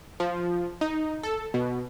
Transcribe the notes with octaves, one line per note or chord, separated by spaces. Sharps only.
F3
D#4
A4
B2